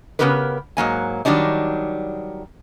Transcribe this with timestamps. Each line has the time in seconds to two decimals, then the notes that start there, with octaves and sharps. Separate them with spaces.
0.19 C#3 E3 B3 G4 A#4 B4
0.77 G#2 F#3 A#3 G#5
1.25 D#3 F#3 G3 D4 D#4